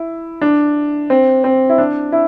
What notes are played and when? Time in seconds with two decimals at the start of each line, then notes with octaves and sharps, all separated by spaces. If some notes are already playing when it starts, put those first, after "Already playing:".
Already playing: E4
0.41 D4
1.10 C4
1.44 C4
1.69 E4
1.78 D4
2.12 E4